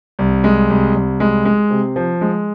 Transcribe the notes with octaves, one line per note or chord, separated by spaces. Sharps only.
C2
G#3
C2
C2
G#3
G#3
C3
F3
G#3